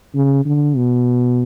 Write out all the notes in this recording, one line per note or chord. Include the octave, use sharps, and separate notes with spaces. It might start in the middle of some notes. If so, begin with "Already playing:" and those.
C#3
D3
B2